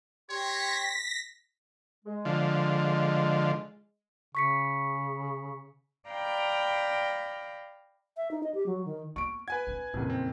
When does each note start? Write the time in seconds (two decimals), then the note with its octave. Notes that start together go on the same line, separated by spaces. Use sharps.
0.30 G4 C#5 G5 C6 A#6 B6
2.05 G#3
2.25 D3 F3
4.35 C#3 C#6 B6 C#7
6.08 D5 F5 G5 A#5 B5
8.17 E5
8.31 D#4
8.43 D#5
8.54 G4
8.66 F#3
8.85 D#3
9.16 A#3 B3 C#6 D7
9.48 B4 F#5 G#5 G#6
9.67 C4 D4
9.94 F#1 F2 A#2 D#4
10.10 C4